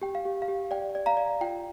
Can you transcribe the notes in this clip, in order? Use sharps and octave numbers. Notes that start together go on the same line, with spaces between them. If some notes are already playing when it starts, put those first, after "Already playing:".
G4 G5
F5
G4
F5
G4
D5 G5
D5
F5 A#5
D5
F4 G5